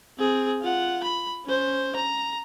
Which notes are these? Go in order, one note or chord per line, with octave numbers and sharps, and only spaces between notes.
C4 G#4
F4 F#5
B5
C#4 C5
A#5